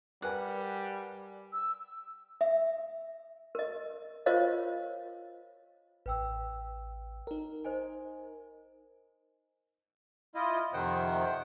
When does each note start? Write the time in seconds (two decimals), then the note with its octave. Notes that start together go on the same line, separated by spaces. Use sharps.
0.22 G3 A#4 B4 F#5 G#5
1.53 E6
2.41 E5
3.55 A#4 D#5
4.26 F4 A#4 C5 C#5 D#5 F5
6.06 A1 B4 G5 E6
7.27 D#4 A#4
7.65 C5 D#5 G#5
10.35 E4 F4 D#5
10.73 F2 C3 D#3 C5 F#5 G5